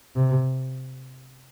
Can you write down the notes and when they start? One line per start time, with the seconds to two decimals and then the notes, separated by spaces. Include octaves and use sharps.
0.16 C3